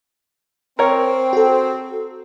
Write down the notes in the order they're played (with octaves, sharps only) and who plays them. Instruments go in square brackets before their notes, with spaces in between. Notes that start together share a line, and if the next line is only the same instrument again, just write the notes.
[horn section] C4 [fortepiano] A#4 C#5
[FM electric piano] F#4 A4